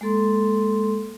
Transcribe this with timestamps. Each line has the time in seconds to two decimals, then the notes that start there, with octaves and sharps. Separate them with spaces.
0.01 G#3 A#3 A4 C6